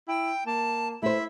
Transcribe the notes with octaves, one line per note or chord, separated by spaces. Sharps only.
E4 G5
A#3 A5
A3 E4 C5 E5